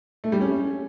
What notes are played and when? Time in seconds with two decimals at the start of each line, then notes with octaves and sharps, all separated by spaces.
0.24 A3
0.32 G3
0.41 C#4